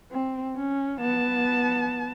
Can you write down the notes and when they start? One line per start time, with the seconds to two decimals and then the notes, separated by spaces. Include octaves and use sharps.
0.11 C4
0.56 C#4
1.01 B3 A5